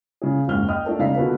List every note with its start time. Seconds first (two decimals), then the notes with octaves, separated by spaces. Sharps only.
0.22 C#3 G#4
0.48 F#1 D#2 G#2 F6 G7
0.68 D#5 G5 D#6 F6
0.85 A3 D4 F4 A4 A#4
0.99 E1 C#3 D#4 F5 A#5 B6
1.16 B2 D3 A#3 F4 A4 B4